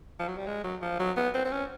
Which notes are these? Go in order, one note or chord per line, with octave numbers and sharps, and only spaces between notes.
F3
F#3
G3
G#3
F#3
F3
F#3
B3
C4
C4
C#4